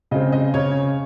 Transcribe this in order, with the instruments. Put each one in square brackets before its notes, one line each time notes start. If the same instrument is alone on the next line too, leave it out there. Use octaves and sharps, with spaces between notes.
[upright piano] C#3 G#3 C4 D#5
D#5
C#3 C#5